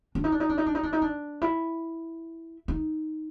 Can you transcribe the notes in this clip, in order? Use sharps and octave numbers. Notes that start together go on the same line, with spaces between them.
D4
D#4
D4
D#4
D4
D#4
D4
D#4
D4
D#4
D4
E4
D#4